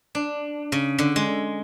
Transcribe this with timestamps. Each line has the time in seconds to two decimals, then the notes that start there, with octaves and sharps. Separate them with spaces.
0.15 D4
0.72 C#3
0.98 D3
1.16 G#3